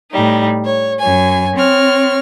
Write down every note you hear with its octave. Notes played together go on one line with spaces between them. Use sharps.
A2 G3 D#4
C#5
F#2 C#5 G#5
C4 C#5 F6